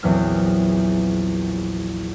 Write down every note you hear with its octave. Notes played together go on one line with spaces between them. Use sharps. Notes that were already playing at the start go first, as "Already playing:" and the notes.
A#1 E2 E3 F#3 C4 F6